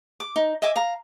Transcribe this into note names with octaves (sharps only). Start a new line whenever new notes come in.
D6
D#4
D#5 E5 G#5 D6
F5 A#5